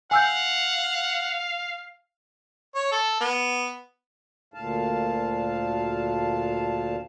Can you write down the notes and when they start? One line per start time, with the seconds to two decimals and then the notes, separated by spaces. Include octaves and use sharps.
0.11 F5 F#5 G#5 E6 G6
2.75 C#5
2.92 A4
3.21 B3
4.54 D2 A#2 F5 A5